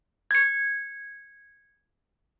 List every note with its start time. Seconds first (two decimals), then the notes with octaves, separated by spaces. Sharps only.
0.31 G#6 C#7